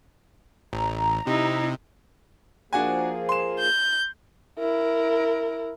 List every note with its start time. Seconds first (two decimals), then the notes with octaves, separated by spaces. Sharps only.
0.73 A1 A#5
1.27 C3 D#4 E4
2.73 F3 A#3 D4 F#4 G#4 G#5
3.29 C6 E7
3.59 G6
4.59 E4 A#4